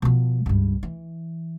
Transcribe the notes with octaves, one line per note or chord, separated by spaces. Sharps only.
B2 F3
C#2 G2
E3